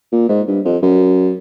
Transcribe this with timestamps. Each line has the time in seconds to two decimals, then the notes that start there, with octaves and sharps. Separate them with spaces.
0.12 A#2
0.29 G#2
0.48 G2
0.65 F2
0.83 F#2